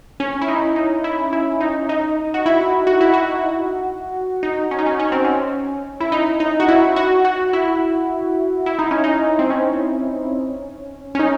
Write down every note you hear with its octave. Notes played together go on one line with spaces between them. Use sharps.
C#4
E4
D#4
D#4
E4
E4
D#4
D#4
F#4
E4
F#4
E4
F#4
D#4
C#4
D#4
C#4
C#4
C4
C#4
E4
D#4
D#4
F#4
E4
F#4
F#4
E4
E4
D#4
C#4
D#4
C4
C#4
C#4
D#4